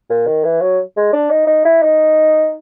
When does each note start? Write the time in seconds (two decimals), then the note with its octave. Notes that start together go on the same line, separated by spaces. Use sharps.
0.10 A#2
0.27 D#3
0.45 E3
0.61 F#3
0.97 G#3
1.13 D4
1.30 D#4
1.47 D#4
1.65 E4
1.83 D#4